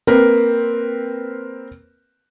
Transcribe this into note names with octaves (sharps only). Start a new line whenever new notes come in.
A#3 C4 A#4 B4